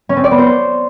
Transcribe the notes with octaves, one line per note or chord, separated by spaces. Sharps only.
C#4
C4
D5
B3
C5